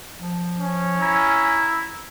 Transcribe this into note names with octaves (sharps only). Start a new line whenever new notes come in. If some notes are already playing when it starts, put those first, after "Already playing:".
F3
C#4
E4 A#5